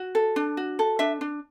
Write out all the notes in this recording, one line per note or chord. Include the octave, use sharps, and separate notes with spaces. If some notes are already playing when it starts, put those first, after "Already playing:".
Already playing: F#4
A4
D4
F#4
A4
D4 E5
D4